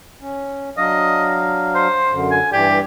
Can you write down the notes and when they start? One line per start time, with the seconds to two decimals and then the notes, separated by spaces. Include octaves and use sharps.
0.22 C#4
0.77 F#3 D4 D#5 F5
1.75 C5
2.12 F#2 D3
2.31 G#5
2.52 G2 E3 G4 D5